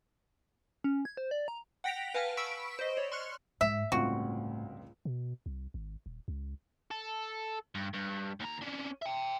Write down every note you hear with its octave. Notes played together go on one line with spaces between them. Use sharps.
C#4
G#6
C5
D5
A#5
F#5 G5 A#6 B6 D7 F7
B4 F5 F#5 G#5 A5 F6
B5 C#6 E6 B6 D7
C5 D#5
C#5 D5
C6 C#6 F6 F#6 C#7
G#2 E5
G1 C#2 A2 C4 F#4
B2
C2
G#1
D#1
C#2
A4
G2
G2
D#2 A#5
C#4 D4
E5 G5